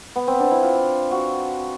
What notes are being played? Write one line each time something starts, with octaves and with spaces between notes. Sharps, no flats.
B3
C4
D4
E4
F4
F#4